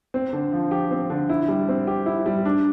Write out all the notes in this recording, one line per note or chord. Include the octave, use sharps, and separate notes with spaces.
C4
D3
F3
G4
C4
D3
E4
G3
C4
G4
E4
G3
D4